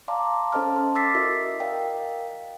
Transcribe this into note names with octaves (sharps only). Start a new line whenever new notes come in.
D5 F5 A5 A#5 C6 D6
C#4 A4 C5 D#5 A5 F6
D#5 C6
D6 E6 A6 B6 C7
E4 F#4 A#4 D#5 E5
A#4 D5 D#5 F5 G5